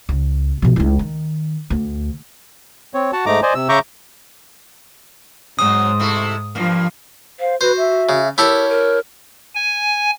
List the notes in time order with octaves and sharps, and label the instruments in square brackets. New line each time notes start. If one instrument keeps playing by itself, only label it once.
[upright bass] C#2
B2 F3
C#2 E4
D#3
D2
[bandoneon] C4 C#5
F#4 F#5 A5
G#2 A3 D#4 A#5 D6
C5 D5 D#5 G#5
C3 E6
C#3 E5 A#5 C#6 D6 G6
[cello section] G#2 [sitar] F#3 G#3 C4 [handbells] D#6
[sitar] C3 A3 E4
[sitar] G2 A#3 [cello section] F3
[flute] C5 [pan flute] F5
[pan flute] F#4 [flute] B4 [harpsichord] C5
[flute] E5
[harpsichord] C#3
[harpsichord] E4 G4 A4 [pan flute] A#4 [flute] C#5
[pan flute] A#4
[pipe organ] G#5